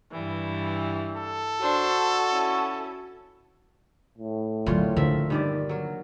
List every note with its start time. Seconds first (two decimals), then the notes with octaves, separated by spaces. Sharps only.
0.12 G2 E3 G3
1.16 A4
1.61 D4 F#4 C5
2.29 C#4 E4
4.18 A2
4.66 D2 A#2 F#3 F4 C#5
4.97 D3 F3 A#4 E5
5.30 G2 D#3 D5
5.69 F#3 A#4